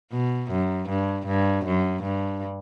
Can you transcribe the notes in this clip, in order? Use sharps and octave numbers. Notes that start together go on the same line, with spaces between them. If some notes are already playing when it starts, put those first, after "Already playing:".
B2
F#2
G2
G2
F#2
G2